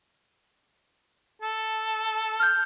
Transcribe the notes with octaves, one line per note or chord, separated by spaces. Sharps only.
A4
F6 G6